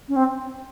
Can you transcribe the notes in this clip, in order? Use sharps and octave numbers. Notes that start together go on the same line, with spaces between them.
C#4
C4